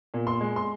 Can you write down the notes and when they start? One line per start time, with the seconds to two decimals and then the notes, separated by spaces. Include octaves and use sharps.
0.14 A#2
0.27 C6
0.41 G#3
0.56 C6